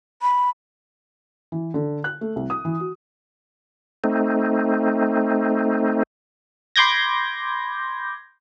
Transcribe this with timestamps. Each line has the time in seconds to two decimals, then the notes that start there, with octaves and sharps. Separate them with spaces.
0.22 B5
1.52 E3
1.74 D3
2.04 F#6
2.21 A3
2.36 C2
2.50 D#6
2.65 E3
2.80 F#4
4.04 A3 C4 D#4
6.76 B5 C6 D6 G6 G#6 A#6